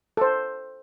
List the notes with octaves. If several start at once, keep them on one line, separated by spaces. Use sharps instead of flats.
A4 C5